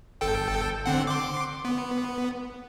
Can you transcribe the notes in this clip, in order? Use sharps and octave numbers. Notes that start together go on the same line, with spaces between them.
G1 A4 G5
D3 C4 F#5
C6 D6
B3